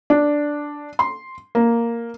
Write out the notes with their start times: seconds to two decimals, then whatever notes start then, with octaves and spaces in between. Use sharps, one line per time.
0.10 D4
0.99 C6
1.55 A#3